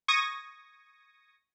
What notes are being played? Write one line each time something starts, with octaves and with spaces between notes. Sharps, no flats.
C#6 D#6 G#6 A#6